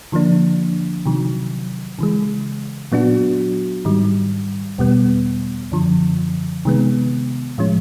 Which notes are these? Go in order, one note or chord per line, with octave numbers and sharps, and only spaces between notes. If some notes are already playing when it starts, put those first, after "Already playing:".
D3 F3 A#3 D4
C3 D#3 F#3
C#3 E3 G#3
A#2 F#3 B3 D4 F#4
G#2 D#3 G3
E2 B2 G3 B3
F#2 D3 F3
C3 D#3 G#3 B3
A2 F3 G#3 C#4